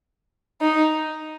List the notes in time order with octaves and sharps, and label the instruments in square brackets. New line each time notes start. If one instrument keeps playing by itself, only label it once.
[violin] D#4